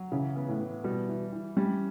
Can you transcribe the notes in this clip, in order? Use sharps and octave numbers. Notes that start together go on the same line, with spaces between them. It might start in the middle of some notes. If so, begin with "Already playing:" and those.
Already playing: F#3
C#3 E3
B3
A2
E3
B2 G3
E3
E3
G3 C#4